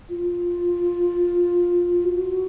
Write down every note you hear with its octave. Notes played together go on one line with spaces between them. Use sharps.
F4
F#4